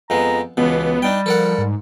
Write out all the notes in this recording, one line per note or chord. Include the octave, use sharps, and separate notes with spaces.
F2 G#3 B3 A#5
C#2 B2 E3 B3
G3 D4 D#4 G5
F3 A4 A#4 F#5
G#2